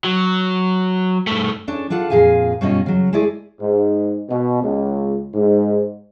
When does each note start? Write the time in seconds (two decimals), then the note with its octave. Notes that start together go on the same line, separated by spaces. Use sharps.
0.04 F#3
1.27 G2 A3
1.68 C#4 D4 A4
1.90 D4 F4 A4 F#5
2.10 F2 A#2 G#4 F5 G#5
2.61 G2 B2 G3 C#4 F4 D#5
2.86 C#3 F#3
3.13 G#3 A3 E4 G#4 D5
3.60 G#2
4.29 B2
4.63 C#2
5.33 G#2